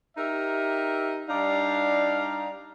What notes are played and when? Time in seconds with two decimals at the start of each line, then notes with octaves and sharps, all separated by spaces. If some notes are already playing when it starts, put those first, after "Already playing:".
0.18 D#4 G4 A#4 E5
1.29 G3 D4 D#4 D5 F5